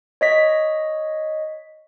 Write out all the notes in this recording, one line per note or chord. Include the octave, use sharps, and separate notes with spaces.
C#5 D#5 B6